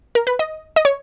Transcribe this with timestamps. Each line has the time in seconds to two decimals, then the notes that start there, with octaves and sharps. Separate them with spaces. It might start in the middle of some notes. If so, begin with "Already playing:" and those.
0.15 A#4
0.27 B4
0.39 D#5
0.76 D#5
0.85 C#5